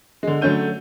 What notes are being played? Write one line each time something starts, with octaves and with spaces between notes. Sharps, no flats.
D3 G#3
D3 F#3 A3 C#4 G6 D#7